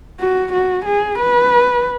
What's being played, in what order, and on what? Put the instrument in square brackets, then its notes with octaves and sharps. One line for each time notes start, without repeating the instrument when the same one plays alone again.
[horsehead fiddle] F#4
F#4
G#4
B4